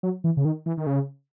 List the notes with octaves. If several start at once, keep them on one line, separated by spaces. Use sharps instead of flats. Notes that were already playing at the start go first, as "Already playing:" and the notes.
F#3
E3
C#3
D#3
E3
D#3
C#3